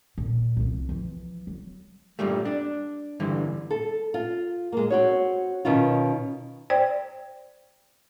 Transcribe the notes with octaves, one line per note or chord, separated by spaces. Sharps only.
A#2
C2 F3
E3 F3
F#3
G2 A#2 G3 A3
D4
G2 D3 E3
A4
F4
G#3 A#3
C4 F#4 C#5
B2 D#3 C#4 F4
C5 D5 G5